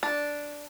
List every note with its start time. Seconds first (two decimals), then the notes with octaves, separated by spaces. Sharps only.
0.03 D4